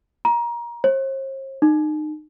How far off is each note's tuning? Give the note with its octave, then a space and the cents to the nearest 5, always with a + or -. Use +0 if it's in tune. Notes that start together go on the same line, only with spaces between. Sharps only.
A#5 +25
C5 +45
D#4 -30